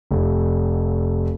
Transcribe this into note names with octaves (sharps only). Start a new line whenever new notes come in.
F1